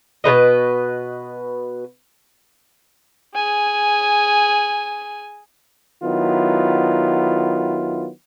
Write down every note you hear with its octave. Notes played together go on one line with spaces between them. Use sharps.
B2 G3 B4 D#5
G#4 G#5
D#3 F#3 B3 E4 F4